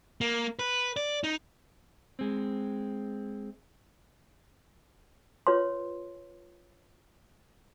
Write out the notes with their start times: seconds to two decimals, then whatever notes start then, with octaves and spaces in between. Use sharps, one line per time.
0.21 A#3
0.59 B4
0.97 D5
1.24 D#4
2.19 G#3 C4
5.47 F4 B4 C#5 C6